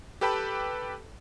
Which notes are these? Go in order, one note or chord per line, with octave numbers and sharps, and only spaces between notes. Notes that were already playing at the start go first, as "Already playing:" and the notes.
G4 A4 B4 G5 A5 B5